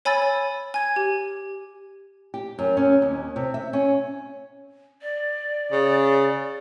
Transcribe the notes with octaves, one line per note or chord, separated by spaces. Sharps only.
C#5 G#5 B5 E6 A6
C#5
G#5 G#6
G4
G4
F#2
C#4
D#2
C3
E5
C#4
D5
C#3